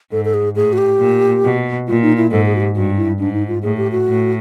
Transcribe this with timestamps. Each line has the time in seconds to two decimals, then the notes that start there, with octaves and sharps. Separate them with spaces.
0.12 G#2 A4
0.25 A4
0.34 G#4
0.56 A2 G#4
0.73 F#4
0.78 G4
1.00 A#2
1.43 B2
1.87 A#2 F4
2.02 D#4
2.17 E4
2.31 G#2 A4
2.46 G#4
2.55 F#4
2.60 G4
2.75 G2 F#4
2.97 E4
3.19 G#2 D4
3.33 D#4
3.48 F4
3.63 A2 G#4
3.78 G4
3.92 F#4
4.07 A2